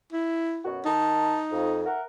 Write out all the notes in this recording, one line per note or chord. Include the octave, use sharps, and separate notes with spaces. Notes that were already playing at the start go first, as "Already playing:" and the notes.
E4
F#2 B2 F#4
D#3 D#4 A5
F2
A#4 E5 F#5